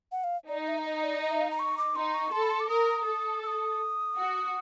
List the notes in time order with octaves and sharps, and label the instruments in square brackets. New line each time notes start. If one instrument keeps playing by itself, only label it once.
[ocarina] F#5
F5
[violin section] D#4 [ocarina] D5
[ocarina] D#5
E5
D#5
D5
D#5
E5
F5
A#5
C#6
D6
[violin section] D#4 [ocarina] C6
[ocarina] C#6
[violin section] A4 [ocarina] C6
[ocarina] B5
C6
D6
[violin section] A#4 [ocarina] D#6
[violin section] A4
[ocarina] E6
D#6
[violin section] F#4